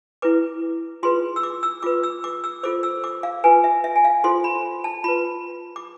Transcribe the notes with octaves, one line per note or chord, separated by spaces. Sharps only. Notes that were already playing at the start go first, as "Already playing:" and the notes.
E4 B4 D6
F4 G#4 B4 C6
E6
D6
E6
F4 B4 D6
E6
D6
E6
F4 A4 C5 D6
E6
D6
F5
F4 B4 G#5
E5
E5
G#5
F5
F4 A4 C5 C6
B5
A5
F4 B4 B5
D6